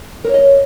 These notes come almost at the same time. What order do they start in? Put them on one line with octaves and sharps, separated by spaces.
A#4 C#5 D#5